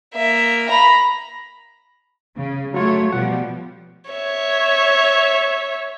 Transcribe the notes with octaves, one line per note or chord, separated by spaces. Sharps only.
A#3 E5
A#5 B5
C#3
F#3 A3 F4 C#5
B2 F3 G3 F#5
C#5 E5